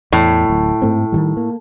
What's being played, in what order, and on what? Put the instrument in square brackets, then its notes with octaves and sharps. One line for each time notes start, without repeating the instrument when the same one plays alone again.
[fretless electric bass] E2 [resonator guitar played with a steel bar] A2
[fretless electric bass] D1
G#2 A3 C4
D#3 E3 G3
A#3